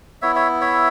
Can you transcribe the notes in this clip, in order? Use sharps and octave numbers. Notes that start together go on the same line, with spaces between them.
B3 E4 C#5 E5
C#5 E5
C#5 E5